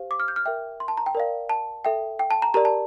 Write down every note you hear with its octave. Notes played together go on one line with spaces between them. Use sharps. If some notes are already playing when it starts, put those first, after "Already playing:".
Already playing: G4 C5 F5
D6
F6
G6
F6
A#4 E5 G5
C6
A5
A#5
G5
A#4 D5 F5
A5
A4 E5 G5
G5
A5
A#5
G4 A#4 D5 A#5
A5